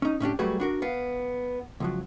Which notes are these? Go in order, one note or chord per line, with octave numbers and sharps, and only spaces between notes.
C#4 D#4
A2 C#4 D4 G4
F#3 G3 A3 F#4 G#4 B4
D4 F#4 A#4
B3 F5
C#2 F3 F#3